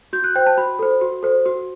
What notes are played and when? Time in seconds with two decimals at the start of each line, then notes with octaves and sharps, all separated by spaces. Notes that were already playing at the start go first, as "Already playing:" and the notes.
0.13 F#4 G6
0.24 F#6
0.35 C5 G5
0.46 A5
0.58 F#4 B5
0.79 A4 C5
1.01 F#4
1.23 A4 C5
1.46 F#4